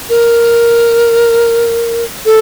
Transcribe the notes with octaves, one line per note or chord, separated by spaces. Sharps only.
A#4
A4